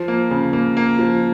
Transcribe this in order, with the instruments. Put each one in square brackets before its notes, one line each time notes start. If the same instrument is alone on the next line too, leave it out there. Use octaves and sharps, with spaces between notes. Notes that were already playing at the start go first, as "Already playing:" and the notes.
Already playing: [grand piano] F3
A#3
C#3
A#3
A#3
F3